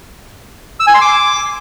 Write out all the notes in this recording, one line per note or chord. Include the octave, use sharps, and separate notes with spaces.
E6
G#5
C6
D6